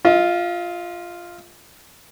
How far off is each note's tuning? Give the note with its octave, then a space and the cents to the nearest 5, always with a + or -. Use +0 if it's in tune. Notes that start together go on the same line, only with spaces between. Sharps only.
F4 +0 D#5 +45